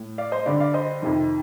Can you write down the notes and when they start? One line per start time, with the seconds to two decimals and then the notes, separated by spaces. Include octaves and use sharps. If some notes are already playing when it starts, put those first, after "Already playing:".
Already playing: A2
0.18 D5 F5
0.32 C5 D#5
0.45 G2 D3 D5 F5
0.60 D5 F5
0.74 C5 D#5
1.02 F2 C3 D#3